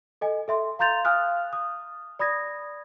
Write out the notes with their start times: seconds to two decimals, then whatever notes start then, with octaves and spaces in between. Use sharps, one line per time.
0.21 A4 D#5 G#5
0.48 A4 E5 C6
0.79 F5 A#5 C6 G6 A6 F7
1.05 F5 G#5 D#6 F6 F#6
1.53 D#6
2.19 D5 B5 D#6 G#6 A#6